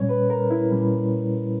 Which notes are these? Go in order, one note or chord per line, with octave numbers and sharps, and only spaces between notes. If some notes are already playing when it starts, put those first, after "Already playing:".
Already playing: A#2 G3 C#4 C#5
B4
A#4
E4
A#2 G3 C#4